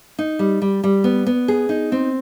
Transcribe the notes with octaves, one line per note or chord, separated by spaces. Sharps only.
D#4
G3
G3
G3
B3
B3
G#4
D#4
C4